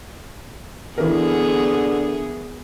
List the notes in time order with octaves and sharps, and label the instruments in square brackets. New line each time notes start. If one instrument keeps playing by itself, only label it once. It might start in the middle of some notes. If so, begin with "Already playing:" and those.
[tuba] D3 [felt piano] E3 A#4 [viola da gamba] B3 G#4